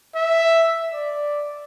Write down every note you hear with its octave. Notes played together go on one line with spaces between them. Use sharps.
E5
D5